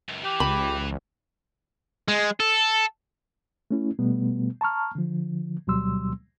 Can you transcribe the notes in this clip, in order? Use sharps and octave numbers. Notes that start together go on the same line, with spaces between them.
C#2 F#2
E3 G4
C#2 B5
G#3
A4
A3 C#4 E4
B2 G3 A3 B3
A5 A#5 C#6 F6
D3 F3
D2 B2 F#3 G3 C6 E6